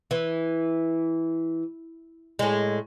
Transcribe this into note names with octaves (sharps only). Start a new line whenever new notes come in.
E3
A2 G#3